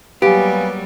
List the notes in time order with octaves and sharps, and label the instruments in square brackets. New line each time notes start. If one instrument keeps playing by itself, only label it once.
[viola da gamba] F#3 G3 A#3 [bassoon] B3 [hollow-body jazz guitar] G4 [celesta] F5 G#5